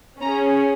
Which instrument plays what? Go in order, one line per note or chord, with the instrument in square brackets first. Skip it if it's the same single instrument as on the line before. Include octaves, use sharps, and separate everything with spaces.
[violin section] C#4 G#4 A#5